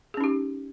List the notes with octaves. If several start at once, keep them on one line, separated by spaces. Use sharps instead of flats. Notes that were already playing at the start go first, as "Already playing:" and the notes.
C#4 D#4 G4 G#4